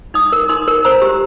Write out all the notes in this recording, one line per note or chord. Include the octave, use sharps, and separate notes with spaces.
D#4 D#6
A#4
D#4 C6
A#4
C5 A#5
G4